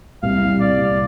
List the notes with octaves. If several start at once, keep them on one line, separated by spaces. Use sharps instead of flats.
C2 F5
G3
C3 D5
C2